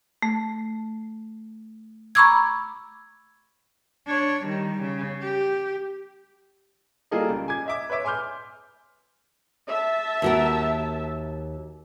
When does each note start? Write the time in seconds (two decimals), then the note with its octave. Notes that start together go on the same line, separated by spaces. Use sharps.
0.23 A3
2.15 A#5 B5 C#6 D6 E6 G#6
4.07 D4 C#5
4.44 D#3 G3
4.82 C#3
5.22 G4
7.11 G3 A#3 F4 G#4 A4 D#5
7.29 C#2
7.48 G#5 D6 G#6
7.66 D#5 E5 D6
7.90 B4 C#5 E5 D6
8.05 G#5 C6 D6 F6 G6
9.67 E5 A5
10.22 D#2 F#4 A#4